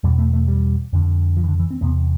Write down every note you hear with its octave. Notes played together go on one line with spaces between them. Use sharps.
E2 B2 G3
A3
A3
G3
F2 D3
F3
E3
D3
E3
C4
E2 C3 B3